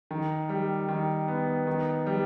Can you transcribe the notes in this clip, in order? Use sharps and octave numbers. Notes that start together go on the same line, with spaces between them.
D#3
G3
D#3
B3
D#3
G3